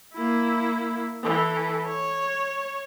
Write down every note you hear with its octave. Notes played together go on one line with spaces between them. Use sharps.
A#3 E4
E3 A4
C#5